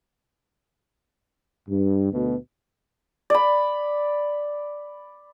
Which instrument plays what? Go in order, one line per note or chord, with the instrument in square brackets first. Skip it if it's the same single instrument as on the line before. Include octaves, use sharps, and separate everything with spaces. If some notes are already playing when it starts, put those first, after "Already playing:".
[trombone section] G2
D2 B2
[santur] D5 B5